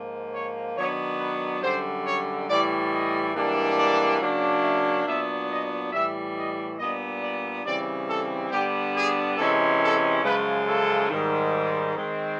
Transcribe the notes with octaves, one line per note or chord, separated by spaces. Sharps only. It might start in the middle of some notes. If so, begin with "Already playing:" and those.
Already playing: G#2 F3 A#3
C#5
D#3 F#3 B3 D4 C#5
B4
F#2 D3 G3 C5
C#5
A2 E3 G3 D5
D#5
G#2 E3 G3 A#3 D4
D5
C#3 F#3 A#3 D4
E5
A#2 F#3 B3 D4 E5
D#5
A2 E3 G3 E5
D#5
A#2 G3 B3 D4 D#5
D5
C#3 E3 G3 C4 D5
A4
D3 G3 B3 D4 G4
G#4
C3 E3 G#3 C#4 A4
A4
F#2 C#3 F3 G#3 B4
A4
G#2 D#3 G3
D#3 G#3 C4